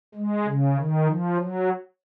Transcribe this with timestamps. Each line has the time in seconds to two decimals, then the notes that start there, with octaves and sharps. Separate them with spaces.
0.15 G#3
0.46 C#3
0.76 D#3
1.06 F3
1.37 F#3